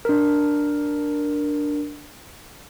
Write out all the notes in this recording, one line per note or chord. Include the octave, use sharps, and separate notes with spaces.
D4 A#4